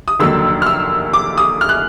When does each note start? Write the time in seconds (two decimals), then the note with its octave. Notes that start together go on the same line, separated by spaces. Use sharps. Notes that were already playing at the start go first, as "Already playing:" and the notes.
0.08 D#6
0.19 F1 D#2 D3 F#3 A#3 E6
0.62 F6
0.66 E6
1.13 D6
1.38 D#6
1.61 F6
1.69 F#6